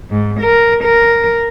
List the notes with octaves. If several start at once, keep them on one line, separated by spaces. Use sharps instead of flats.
G#2
A#4
A#4